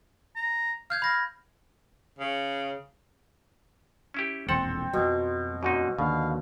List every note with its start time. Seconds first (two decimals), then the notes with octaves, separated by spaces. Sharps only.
0.36 A#5
0.90 F5 F6 G6 G#6
1.02 B5 A#6
2.19 C#3
4.14 C#4 E4 G4
4.49 E1 A#1 F2 C4 A4 F#5
4.93 F2 B2 F#3
5.63 F#2 A#2 D#4 F#4
5.99 D#2 B2 D3 F5